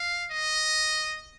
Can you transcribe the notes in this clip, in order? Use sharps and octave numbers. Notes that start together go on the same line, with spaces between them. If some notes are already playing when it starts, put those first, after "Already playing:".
Already playing: F5
D#5